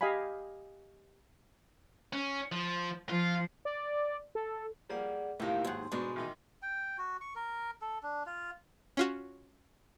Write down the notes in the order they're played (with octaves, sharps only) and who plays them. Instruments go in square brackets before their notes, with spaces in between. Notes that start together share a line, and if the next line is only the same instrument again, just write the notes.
[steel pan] G4 D#5 F5 G#5 B5
[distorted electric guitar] C#4
F3
[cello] F3 [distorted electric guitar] F4
[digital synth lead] D5
A4
[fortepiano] F3 G3 A#3 [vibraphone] G#4 D5 F#5
[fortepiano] C#2 A2 C3 [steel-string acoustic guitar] D#3 A#3 [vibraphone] E4 G4
[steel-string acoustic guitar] D#2 G#2 [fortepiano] F#3 G#4 F#5 [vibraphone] C6
[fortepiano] G#2 D4 [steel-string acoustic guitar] B2 G#3
[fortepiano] A1 D#3 D#4
[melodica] G5
F#4
C#6
A#4
A4
D4
F4
[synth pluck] C#4 F4 F#4